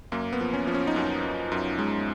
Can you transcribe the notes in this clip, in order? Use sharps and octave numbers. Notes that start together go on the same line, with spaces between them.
F#2 A#3
B3
F3
C#4
F3
C#4
D#4
F#2 C#4
F#2
F#2
G#3